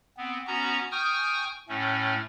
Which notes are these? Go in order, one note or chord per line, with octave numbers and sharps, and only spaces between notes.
B3 C4
B3 C#4 F#4 A#5
G5 G#5 C#6 D#6 F6 G6
A2 A3 C#4